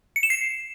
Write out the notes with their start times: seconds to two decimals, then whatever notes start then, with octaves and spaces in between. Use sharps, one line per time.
0.16 C#7
0.23 E7
0.30 C7